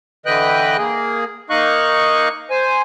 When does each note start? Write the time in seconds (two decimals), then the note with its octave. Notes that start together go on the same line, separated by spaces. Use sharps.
0.26 D3 E3 B4 D#5 G5 F#6
0.78 A#3 G#4
1.50 A#3 D#4 D#5 F5 C#6 F#6
2.50 C5 G#5